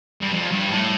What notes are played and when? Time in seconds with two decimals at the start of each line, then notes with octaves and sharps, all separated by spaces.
0.22 G2
0.34 F2
0.52 G2
0.71 A2